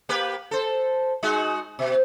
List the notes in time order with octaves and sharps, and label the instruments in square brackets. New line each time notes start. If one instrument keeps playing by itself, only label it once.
[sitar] A#3 G4 B4
A4 C5
G#3 D#4 F#4
B2